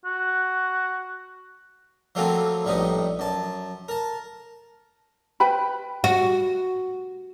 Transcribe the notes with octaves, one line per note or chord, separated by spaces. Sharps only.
F#4
F3 F#3 A3 A#3 C4 F4
A#1 A2 G3 B3 D#4
F#2 A5
A#4 A5
B4 G5 B5
F#4